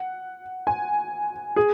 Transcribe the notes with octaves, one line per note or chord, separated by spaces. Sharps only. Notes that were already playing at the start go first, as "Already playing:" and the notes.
Already playing: F#5
G#5
G#4